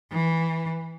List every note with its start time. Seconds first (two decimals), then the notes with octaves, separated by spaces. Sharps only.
0.12 E3